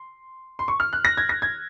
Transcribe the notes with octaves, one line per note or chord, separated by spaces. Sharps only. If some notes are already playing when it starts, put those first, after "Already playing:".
Already playing: C6
C6
C#6
F6
F#6
A#6
G#6
A#6
G#6